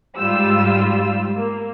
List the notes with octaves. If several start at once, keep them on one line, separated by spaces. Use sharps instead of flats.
G#2 G3 F4 E6
A#3